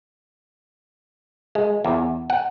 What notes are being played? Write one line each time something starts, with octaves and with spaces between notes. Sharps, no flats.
G#3
E2
F#5